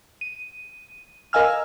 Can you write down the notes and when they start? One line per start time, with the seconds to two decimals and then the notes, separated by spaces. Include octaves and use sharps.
0.21 D#7
1.33 A#4 D#5 F5 G#5 E6 F6